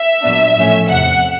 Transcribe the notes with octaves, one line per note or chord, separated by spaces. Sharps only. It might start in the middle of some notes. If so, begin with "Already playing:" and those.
Already playing: E5
A#2 F#3 B3 D4
A2 F3 A3 C#4
E2 C3 F3 F#5